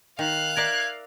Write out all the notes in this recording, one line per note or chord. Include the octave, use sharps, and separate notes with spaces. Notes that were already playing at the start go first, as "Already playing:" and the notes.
D#3 F5 F#6
A#4 D5 E5 G#6